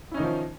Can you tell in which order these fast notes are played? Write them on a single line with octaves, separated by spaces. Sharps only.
E4 C#4 D#4 D#3 F3